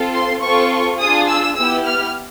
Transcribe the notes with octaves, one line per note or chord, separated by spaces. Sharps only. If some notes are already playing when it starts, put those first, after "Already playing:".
Already playing: C4 F4 A4
C6
C4 F4 A4 C#6
D4 F4 G#4 D#6
E6
B3 E4 G4 E6
F6